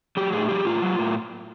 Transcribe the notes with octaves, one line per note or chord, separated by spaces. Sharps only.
F#3 G4
A2 G#4
F#3 G4
A2 F4
F#3
A2